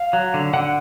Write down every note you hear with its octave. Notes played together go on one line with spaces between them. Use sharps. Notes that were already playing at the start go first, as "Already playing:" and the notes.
Already playing: F5
F#3
D3
D3 F#5